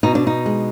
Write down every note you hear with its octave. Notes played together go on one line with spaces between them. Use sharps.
B2 D#4
D4
D#4
G#3